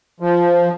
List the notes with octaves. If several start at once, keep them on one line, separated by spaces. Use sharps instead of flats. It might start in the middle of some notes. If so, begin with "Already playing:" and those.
F3